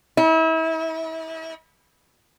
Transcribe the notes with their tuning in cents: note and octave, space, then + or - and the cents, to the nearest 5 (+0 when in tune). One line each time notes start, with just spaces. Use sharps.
E4 -35